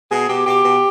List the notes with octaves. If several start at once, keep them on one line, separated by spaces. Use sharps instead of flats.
B2 G#4
B2 G4
B2 G4
B2